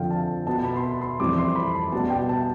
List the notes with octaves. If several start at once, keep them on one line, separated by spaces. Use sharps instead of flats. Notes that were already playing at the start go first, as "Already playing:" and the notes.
Already playing: F2 D3 F3 C4 F5 G5
A5
B2 B3 A5
B5
C6
B5
C6
F2 E3 G3 C4 D6
C6
B5
A5
B2 G3 B3 A5
G5
A5